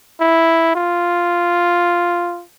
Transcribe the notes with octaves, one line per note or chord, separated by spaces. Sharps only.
E4
F4